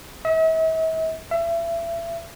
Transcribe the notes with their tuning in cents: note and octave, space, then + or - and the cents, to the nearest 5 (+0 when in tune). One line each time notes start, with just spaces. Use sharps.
E5 -45
E5 +30